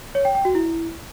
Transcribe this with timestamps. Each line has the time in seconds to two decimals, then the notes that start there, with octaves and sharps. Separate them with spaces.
0.15 C#5
0.25 G5
0.35 G5
0.45 F#4
0.55 E4